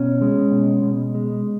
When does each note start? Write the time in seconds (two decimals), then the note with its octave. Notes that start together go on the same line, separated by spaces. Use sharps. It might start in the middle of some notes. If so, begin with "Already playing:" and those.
Already playing: B2 C#4
0.22 G#3
0.52 B2
0.83 B2
1.15 G#3